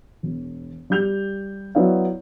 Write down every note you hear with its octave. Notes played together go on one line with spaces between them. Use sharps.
E1
G3 G4 G6 F7
F#3 B3 E4 C#5 D5 F5